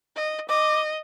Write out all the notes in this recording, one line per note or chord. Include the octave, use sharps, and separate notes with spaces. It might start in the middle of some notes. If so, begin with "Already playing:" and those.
D#5
D#5 D6